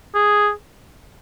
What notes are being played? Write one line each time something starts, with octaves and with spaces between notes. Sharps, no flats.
G#4